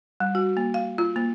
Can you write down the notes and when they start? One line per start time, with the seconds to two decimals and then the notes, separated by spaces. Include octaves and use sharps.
0.20 G3
0.35 F#4
0.57 A#3
0.74 F5
0.98 F4
1.16 A#3